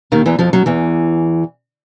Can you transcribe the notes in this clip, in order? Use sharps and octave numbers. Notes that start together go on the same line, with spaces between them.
D#2 D#3
E2 E3
F2 F3
F#2 F#3
E2 E3